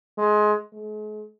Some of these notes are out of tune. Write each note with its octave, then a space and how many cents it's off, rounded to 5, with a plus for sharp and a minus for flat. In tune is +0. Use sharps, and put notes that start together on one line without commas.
G#3 +20
G#3 +40